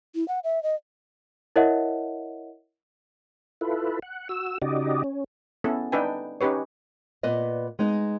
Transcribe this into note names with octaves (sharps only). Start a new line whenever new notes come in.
E4
F#5
E5
D#5
E4 A#4 C#5 D#5 E5 F#5
E4 F4 A4 B4
F#5
F#4 E6
C#3 D#4 F#4 G4 D5 D#5
C#4
B3 C#4 E4 A4
D4 D#4 B4 G5 G#5
C#4 D#4 G4 B4 C#5
A#2 B3 B4 D5 D#5
G#3 B3 D#4